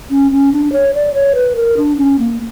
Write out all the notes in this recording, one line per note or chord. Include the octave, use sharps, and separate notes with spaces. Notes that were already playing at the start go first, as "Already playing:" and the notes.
C#4
C#4
D4
C#5
D5
C#5
B4
A#4
D4
C#4
A#3